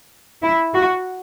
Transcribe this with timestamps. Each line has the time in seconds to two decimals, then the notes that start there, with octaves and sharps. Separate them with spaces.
0.44 E4
0.76 F#4